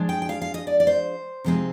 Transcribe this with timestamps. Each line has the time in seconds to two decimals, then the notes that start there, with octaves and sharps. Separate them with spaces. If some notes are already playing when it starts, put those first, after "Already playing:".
Already playing: F3 G#3 D4
0.09 G5
0.22 G5
0.29 F5
0.42 F5
0.54 D#5
0.67 D5
0.80 D5
0.87 C5
1.44 C3 F3 G#3 C4 D#4